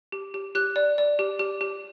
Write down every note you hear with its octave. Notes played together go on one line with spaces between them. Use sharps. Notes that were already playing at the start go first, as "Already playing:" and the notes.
G4
G4
G4 F#6
D5
D5
G4
G4
G4